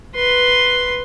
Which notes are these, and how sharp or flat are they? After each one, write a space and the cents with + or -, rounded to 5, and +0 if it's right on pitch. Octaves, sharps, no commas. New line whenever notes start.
B4 +0 C6 +0